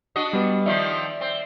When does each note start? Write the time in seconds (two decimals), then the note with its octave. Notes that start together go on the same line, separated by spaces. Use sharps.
0.16 D4 F#4 D#5
0.33 G3 B3
0.66 D#3 F3 C4 D5 E5
1.21 C4